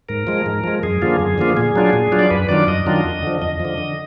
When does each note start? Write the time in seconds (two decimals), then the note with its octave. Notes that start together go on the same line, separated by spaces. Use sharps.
0.09 G#2 A#4
0.27 F3 G#3
0.46 G#2
0.64 F3 G#3
0.83 F#2 G#4
1.02 D3 F3 A#3 F4
1.19 F#2
1.38 D3 F3 A#3 F4
1.57 A#2 G#4
1.76 F#3 D4 F4
1.93 A#2
2.12 F#3 D4 F4
2.19 D5
2.30 F#2 B4
2.48 D#3 F#3 D4 F4 D5
2.67 F#2 D#5
2.86 D#3 F#3 D4 F4
3.05 F2
3.23 D3 F3
3.42 F2 D#5
3.60 F3
3.65 D3
3.78 D3